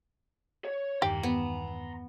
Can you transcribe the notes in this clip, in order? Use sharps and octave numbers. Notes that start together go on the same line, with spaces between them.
C#5
E2 G2 D#3 G4 A#5 C6
B3